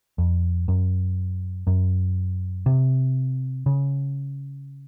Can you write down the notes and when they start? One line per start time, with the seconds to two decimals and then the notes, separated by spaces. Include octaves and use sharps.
0.18 F2
0.68 F#2
1.67 F#2
2.66 C3
3.66 C#3